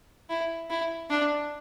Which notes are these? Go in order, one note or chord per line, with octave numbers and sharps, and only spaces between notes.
E4
E4
D4